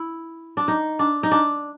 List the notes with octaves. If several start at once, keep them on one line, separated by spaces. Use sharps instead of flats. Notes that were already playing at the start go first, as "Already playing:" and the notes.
Already playing: E4
D4
D#4
D4
D#4
D4